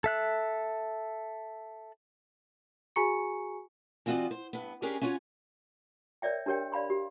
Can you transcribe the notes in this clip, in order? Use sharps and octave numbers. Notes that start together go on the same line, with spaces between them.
A4 E5 F#6
F#4 G#4 G#5 A#5 C#6 C#7
E3 C4 F4 F#4 D5 D#5
C5
G2 B3
C#4 D4 G4 G#4 A#4 C#5
C#4 F4 F#4 C#5 G#5
A#4 C#5 D5 E5 G5
D4 G4 A#4 C#5 G5
D5 F5 B5 C6
G4